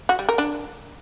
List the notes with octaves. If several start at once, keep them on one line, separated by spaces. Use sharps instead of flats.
F#4
G3
A#4
D4